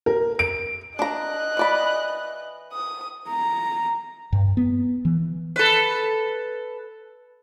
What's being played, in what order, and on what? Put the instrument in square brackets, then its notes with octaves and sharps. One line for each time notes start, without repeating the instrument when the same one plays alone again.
[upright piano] A#4
D7
[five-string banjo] D4 A#5 [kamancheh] D#5 F#6
[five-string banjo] E3 D5 B5
[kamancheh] D#6
[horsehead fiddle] A#5
[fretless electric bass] G2
B3
E3
[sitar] A4 B4